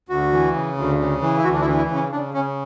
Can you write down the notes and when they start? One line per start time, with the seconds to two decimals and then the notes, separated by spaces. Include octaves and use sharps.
0.09 D2 F#4
0.32 E3
0.54 C#3
0.77 D2
0.99 C#3
1.22 E3
1.38 E4
1.44 D2 F#4
1.53 D4
1.61 E4
1.67 E3
1.78 E4
1.89 C#3
1.94 C#4
2.12 C#3 D4
2.34 C#3 C#4